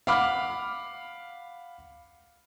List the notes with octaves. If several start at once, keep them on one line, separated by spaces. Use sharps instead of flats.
F5 F#5 B5 D6 F6